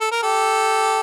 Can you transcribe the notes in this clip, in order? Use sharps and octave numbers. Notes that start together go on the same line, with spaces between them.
A4
A#4
G4 A4